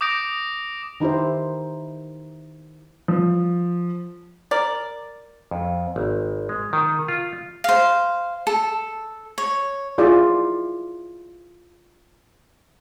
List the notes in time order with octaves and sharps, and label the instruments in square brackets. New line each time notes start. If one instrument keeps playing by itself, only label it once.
[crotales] D6 D#6 G6 A#6 D7
[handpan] D#3 D#4 E4 G4 C5
[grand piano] F3
[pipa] A#4 D5
[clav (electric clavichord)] F2
G#1
G#3
D#3
F4
[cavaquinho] C5 F5
A4
C#5
[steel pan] E4 F4 G#4 D5